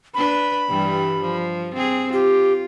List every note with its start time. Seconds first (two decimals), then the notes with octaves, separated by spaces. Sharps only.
0.14 D4 B4 B5
0.68 G2 E3 G3
1.21 F3
1.74 C4 G#4
2.13 F4 G4